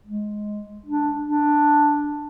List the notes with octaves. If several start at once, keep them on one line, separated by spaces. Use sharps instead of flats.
G#3
D4
D4